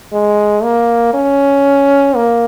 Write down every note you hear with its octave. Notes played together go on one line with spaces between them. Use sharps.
G#3
A#3
C#4
A#3